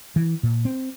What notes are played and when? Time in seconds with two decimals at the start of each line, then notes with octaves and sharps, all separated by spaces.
0.16 E3
0.43 A#2
0.65 C4